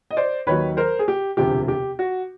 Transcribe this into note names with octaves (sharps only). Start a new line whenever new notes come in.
D#5
C5 D5
D#2 D#3 F#3 B4 C#5
A#4 C5
G#4
G4
E1 D2 C3 F3 G4
G4
F#4